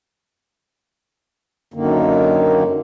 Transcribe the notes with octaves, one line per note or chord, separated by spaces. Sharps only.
F#2 D3 D#3 A#3